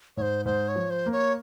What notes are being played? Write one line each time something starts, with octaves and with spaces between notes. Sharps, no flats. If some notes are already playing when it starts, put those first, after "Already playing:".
G#2 C5 C#5
G#2 C5
C#5
F3
C5
A#3
C#5